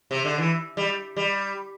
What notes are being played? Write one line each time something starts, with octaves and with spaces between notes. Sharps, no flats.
C3
D3
E3
G3
G3